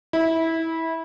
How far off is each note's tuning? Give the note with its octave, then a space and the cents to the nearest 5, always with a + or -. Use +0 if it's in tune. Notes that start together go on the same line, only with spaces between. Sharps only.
E4 -20